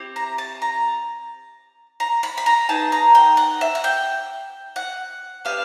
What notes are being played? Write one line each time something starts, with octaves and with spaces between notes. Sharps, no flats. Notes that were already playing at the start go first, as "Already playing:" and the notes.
Already playing: C4 E4 G4
A#5
A5
A#5
A#5
B5
B5
A#5
B3 D#4 G#4 A5
A#5
G5
F#5
E5
F#5
G5
F#5
B3 D4 G4 F5